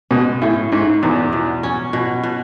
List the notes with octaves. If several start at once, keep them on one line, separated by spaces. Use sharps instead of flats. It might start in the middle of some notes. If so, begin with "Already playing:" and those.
B2 G#3
A2 C#4
G#2 C#4
E2 B2
B2
C#4
B2
B2